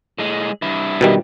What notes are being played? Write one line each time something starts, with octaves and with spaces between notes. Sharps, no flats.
A2 G#3
G2 E4
B2 D#3 G3